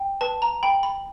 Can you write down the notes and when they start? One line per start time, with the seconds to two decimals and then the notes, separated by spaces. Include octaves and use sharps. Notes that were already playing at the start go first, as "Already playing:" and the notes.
Already playing: G5
0.21 B4 A5
0.42 A#5
0.63 G5 B5
0.83 B5